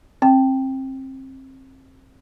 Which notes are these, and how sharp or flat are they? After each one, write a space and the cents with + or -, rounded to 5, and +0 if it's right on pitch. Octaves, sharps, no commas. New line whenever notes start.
C4 +25 G5 +0